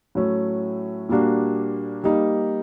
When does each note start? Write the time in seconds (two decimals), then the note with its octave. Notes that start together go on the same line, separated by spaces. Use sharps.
0.15 A2 F#3 A3 C#4
1.09 A#2 G3 A#3 D4 F#4
2.04 G3 A#3 D#4